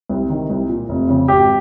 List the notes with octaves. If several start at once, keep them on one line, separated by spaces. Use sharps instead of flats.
C2
C3 D#3
C2
A#2
F1
F2 C#3
G#1 G4